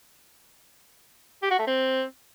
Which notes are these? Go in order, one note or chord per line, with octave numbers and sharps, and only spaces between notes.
G4
F#4
A3
C4